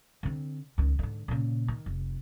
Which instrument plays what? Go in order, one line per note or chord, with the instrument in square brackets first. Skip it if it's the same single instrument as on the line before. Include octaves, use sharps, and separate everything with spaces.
[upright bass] D3 C4
C#2 D#3
G#2 D3
A#2 C#3
D#3
F1